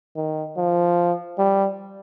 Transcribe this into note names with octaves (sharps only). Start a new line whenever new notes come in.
D#3
F3
G3